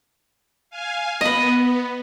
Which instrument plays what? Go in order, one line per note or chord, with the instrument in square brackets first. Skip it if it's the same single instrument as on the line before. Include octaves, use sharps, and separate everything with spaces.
[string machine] F5 G#5
[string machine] B3 [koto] B4 D#5